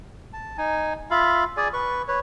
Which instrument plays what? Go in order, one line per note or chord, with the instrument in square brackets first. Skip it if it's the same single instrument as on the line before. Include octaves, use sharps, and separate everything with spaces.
[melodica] A5
D#4 G#5
F4 E5 F5 B5
G#4 D5 G#5
B4 C#6
B4 C#5